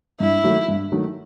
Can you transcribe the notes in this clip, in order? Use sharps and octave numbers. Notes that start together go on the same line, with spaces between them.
G2 E4
D#3 F#3 A3
G2
D#3 F#3 A3